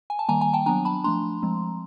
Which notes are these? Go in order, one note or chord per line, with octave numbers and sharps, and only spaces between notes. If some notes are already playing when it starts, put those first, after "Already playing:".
G#5
A5
D#3 G3 A#3 G#5 A#5
G#5 A#5
G5 A5
F#3 B3 D4 G#5 A#5
A5 B5
F3 A3 D4 A#5 C6
F3 G#3 C4